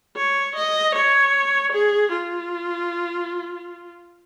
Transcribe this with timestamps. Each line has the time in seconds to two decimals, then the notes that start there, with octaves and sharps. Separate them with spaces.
0.16 C#5
0.55 D#5
0.95 C#5
1.72 G#4
2.12 F4